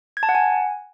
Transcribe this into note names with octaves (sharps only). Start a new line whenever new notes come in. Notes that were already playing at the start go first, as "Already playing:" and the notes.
G#6
A5
F#5
G#5